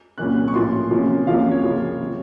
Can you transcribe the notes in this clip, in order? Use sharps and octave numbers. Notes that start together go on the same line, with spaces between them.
C2 A#2 F#3 A#3 C#4 F#6
C#6
A2 F3 A#3 C#4 C6
C3 F3 A#3 C#4
C2 C3 F3 A#3 C#4 F5
C#5
F#2 C#3 F3 A#3
C3 F#3